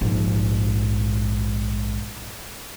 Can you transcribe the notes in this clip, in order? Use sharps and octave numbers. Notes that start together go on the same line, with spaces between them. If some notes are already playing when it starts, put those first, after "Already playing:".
A#1 G#2